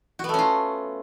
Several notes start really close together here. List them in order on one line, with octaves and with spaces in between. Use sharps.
F#4 B3 A3 C#4 F4